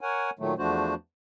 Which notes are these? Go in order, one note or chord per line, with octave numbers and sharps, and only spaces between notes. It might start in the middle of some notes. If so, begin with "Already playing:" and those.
A#4 C#5 F#5 G#5
A#2 D#3 F#3 A3
E2 F3 A3 D4 F#4 C5